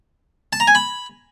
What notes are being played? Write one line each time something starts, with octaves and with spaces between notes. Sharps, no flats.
A5
A#5
G#5
B5